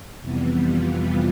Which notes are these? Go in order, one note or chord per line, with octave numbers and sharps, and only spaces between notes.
F2 C3 E3 G3 B3
F4